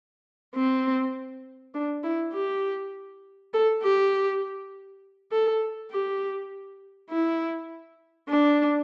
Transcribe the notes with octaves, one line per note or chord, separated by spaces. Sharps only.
C4
D4
E4
G4
A4
G4
A4
G4
E4
D4